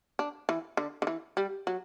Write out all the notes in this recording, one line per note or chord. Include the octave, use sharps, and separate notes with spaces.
D4
E3
D3
D3
E3
G3
F#3